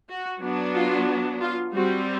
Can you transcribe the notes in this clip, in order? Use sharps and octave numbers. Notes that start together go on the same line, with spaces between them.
F#4
F#3 B3 D4
F4
F4
G3 C4 F#4